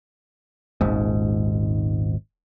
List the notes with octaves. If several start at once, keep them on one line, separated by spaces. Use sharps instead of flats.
D#1 G#1 G#2